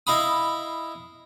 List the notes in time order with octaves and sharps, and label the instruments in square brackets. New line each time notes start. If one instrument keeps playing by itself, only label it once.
[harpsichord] E4 D#5 F5 B5 D#6